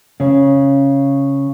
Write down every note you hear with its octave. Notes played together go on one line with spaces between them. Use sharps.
C#3